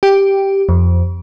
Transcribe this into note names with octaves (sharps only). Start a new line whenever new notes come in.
G4
F2